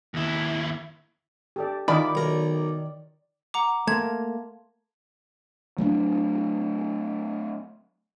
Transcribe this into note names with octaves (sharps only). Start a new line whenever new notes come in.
D#2 E4
G4 A4 D5
D#3 E4 F4 D5 B5 D6
B1 A#4
F#5 A#5 D6
A3 A#3 A5 C6 G#6
F#3 A3 B3 D4